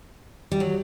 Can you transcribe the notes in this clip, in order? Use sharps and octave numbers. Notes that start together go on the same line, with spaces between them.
G3
F#3